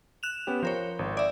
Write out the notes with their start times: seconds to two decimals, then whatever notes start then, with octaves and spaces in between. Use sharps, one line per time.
0.23 F#6 E7 F7
0.47 B3 C#4 G4
0.63 F3 A#4 C5 C#5
0.99 G#1
1.17 D5 E5